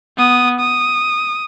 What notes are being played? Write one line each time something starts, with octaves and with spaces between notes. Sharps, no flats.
B3 D#6
D#6